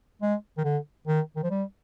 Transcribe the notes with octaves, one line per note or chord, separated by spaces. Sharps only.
G#3
D#3
D3
D#3
D#3
F3
G3